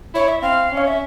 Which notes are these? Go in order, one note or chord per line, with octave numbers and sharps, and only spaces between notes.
E4 C#5
E5
C4 F5
C#4
C#5
E5